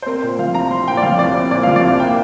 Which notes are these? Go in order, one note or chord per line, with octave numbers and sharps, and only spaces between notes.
C5
C4 A#4
A#2 C5
F3 F5
C2 A#5
C4 C6
A#2 G5
D5
F3 F5
C2 D5
C4
A#2 D5
F5
F3
D5
C2
F5
A#3 G5